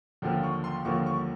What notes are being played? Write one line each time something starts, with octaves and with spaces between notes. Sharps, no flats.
D#2 D3 F3 A#3
C#6
C6
D#2 D3 F3 A#3 C#6
C#6